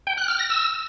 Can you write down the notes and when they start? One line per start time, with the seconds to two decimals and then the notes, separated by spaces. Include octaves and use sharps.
0.07 G5
0.18 F#6
0.28 F6
0.39 A#6
0.50 E6